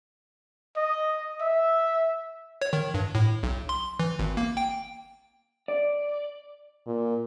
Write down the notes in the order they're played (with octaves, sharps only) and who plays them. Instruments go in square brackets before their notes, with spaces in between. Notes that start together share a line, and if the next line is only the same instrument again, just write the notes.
[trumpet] D#5
E5
[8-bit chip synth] C#5
D#3
G2
A2
B1
C6
E3
G#1
A#3
G5
[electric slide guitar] D5
[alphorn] A#2